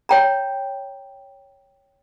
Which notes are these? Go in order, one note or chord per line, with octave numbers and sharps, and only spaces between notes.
C#5 G5 A#5